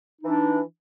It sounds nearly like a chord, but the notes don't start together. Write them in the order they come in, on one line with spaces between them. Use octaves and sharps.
D#4 E3 D4